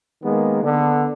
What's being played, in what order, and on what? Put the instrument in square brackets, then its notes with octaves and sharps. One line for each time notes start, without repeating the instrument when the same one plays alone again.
[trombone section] D#3 G#3 A#3 B3
D3 B3